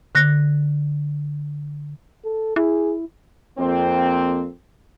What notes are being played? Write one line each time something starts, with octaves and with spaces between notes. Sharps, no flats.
D3 F#6 A#6
A4
E4 G#4
F2 A#3 C4